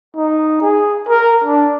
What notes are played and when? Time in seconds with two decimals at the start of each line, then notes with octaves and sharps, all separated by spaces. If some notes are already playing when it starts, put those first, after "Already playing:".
0.16 D#4
0.62 G#4
1.09 A#4
1.44 D4